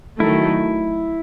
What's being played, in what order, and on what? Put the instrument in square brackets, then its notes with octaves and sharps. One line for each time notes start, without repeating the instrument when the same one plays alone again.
[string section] D#3 F#3 A3 [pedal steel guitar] E4